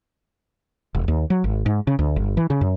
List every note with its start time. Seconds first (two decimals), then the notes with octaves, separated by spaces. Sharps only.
0.95 E1
1.08 D#2
1.30 F#3
1.44 G#1
1.66 G#2
1.87 C#3
1.99 D2
2.16 G1
2.37 E3
2.50 C#3
2.61 F#2